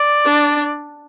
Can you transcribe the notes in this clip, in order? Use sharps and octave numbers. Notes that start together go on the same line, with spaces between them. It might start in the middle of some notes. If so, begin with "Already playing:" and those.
Already playing: D5
D4